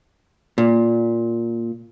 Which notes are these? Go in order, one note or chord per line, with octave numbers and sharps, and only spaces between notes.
A#2